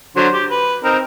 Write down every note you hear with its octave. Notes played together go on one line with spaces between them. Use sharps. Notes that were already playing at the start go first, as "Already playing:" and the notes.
D3 F#3 C5
G4
B4
C4 D#4 A#4